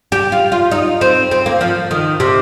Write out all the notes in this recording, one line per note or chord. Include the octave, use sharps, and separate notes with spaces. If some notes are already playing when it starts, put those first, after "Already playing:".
G4
F4
F4
D#4
C4
C4
A#3
F3
D#3
C3